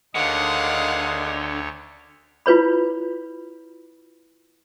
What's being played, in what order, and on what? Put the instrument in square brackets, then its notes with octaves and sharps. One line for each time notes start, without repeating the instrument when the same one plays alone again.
[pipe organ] D2 C#5 [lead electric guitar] D3 [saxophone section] D#3 G#3 D#5 [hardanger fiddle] F5 F#5
[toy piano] E4 F4 B4 C#5 B5